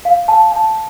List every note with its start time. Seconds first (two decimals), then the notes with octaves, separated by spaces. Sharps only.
0.05 F5
0.28 A5
0.52 A5